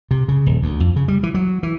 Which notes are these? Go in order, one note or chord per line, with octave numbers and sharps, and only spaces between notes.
C3
C#3
D#1
D2
F2
C#3
G3
E3
F#3
E3